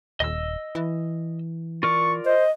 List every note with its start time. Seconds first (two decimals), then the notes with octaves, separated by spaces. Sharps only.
0.20 D#1 D#5 E6
0.75 E3
1.83 F4 A#4 D5 C#6
2.26 C5 D#5